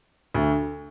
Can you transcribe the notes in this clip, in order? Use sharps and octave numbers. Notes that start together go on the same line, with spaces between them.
D2